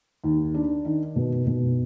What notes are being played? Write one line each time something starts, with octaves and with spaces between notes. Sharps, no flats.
D#2
D4
D#3
B2
B2